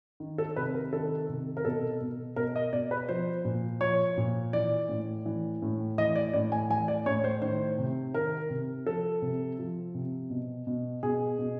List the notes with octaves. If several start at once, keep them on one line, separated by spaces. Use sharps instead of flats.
D#3
A4
C3 B4
A#4
D#3 A4
C3
A#4
B2 A4
B2
B2 A#4
D#5
B2 D5
B4
F3 C5
A#2
F3 C#5
A#2
E3 D5
A2
E3
A2
E3 D#5
D5
A2 D5
G#5
E3 G#5
D5
A2 C#5
C5
D#3 C5
C3
D#3 A#4
C3
F3 A4
C3
F3
C3
B2
B2
B2 G#4
B2